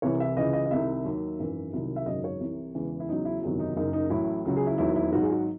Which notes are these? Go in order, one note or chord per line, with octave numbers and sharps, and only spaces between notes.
C2 C3 E3 C#5
E5
C#2 C#3 E3 D#5
D#5
D#5
C2 C3 D#3 E5
D#2 D#3 F#3
G#1 F#2 E3
C2 C3 D#3 F#3
E5
G#1 F#2 C#3 F#3 D#5
C#5
C2 C3 E3
E1 E2 C#3 E3
E4
E2 C#3 F#3 D#4
E4
F#1 E2 C3 D#3 F#3
D#4
F#1 F#2 C#3 D#4
D#4
A1 A2 F#3 E4
C#2 C#3 F#3
G#4
E4
E1 D#2 D#3 F#3 E4
E4
G#1 G#2 F#3 F#4
G#4
F#4